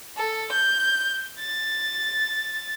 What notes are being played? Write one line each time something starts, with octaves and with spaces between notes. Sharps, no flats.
A4
G6
A6